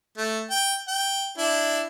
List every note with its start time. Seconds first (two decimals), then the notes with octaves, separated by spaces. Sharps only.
0.17 A3
0.50 G5
0.88 G5
1.38 D4 E4